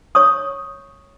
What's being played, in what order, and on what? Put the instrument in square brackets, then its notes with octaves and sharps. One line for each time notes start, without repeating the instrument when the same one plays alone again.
[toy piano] C#5 C#6 D#6